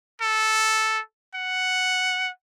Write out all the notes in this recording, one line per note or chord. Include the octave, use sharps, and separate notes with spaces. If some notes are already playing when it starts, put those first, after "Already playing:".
A4
F#5